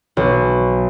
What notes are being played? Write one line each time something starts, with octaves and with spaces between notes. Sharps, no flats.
B1